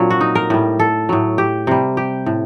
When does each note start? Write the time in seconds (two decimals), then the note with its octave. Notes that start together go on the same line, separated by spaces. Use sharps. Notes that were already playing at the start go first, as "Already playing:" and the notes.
Already playing: A#2 F#3 C4 D4
0.11 F#4
0.21 D#4
0.35 A#4
0.50 A2 G3
0.80 A4
1.09 A2 F#3
1.38 G4
1.67 C3 G3
1.97 G4
2.26 A2